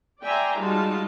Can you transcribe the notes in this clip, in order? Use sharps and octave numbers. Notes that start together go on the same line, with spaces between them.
D5 E5 G5 G#5 A#5 C6
G3 G#3 D#4 F4 F#4 A5